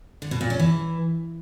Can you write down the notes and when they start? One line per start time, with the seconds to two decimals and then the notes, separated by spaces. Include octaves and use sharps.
0.22 D3
0.31 B2
0.41 A#2
0.50 C#4
0.60 E3